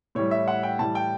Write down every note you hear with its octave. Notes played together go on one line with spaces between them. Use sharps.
A2 E3 G3 C#5
E5
F#5
G5
A2 E3 G3 A5
G5